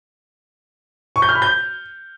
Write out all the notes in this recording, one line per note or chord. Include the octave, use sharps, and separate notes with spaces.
C#6
G6
F6
B5
G6